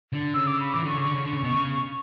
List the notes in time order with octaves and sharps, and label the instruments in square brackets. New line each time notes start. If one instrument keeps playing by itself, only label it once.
[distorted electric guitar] D3
[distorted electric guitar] C#3 [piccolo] E6
[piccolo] D6
B5
[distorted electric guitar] E3 [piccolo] D6
[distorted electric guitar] D3 [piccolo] C#6
[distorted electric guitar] C#3
[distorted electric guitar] D3 [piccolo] C#6
[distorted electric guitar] C#3
D3
C#3
B2
C#3